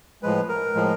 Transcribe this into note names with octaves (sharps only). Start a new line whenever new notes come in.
A2 F3 G#3 B4
A#4
A2 F3 G#3